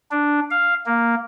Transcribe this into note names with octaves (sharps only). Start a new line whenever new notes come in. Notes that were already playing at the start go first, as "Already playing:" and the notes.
D4
F5
A#3